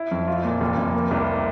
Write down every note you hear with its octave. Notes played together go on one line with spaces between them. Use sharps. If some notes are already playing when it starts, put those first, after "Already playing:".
Already playing: E4
F2
F4
A#2
F1
F1
A#3
C2